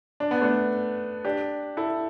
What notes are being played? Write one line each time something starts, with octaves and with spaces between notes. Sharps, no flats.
D4
B3
A3 D4
D4 G4
E4 A4